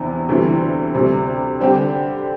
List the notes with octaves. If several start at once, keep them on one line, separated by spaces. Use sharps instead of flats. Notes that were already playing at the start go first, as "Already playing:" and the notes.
Already playing: E2 C3 E3 B3 D4
D2 C3 E3 G3
D2 C3 G3
D3 G3 C4 G4